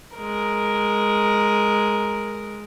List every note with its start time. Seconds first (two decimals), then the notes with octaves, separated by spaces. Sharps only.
0.17 G#3 A#4